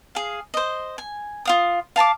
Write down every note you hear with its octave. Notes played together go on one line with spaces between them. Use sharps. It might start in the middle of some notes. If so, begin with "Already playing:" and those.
G#4 F5
C5 D#5
G#5
F4 F5 D#6
F5 A5 A#5 D6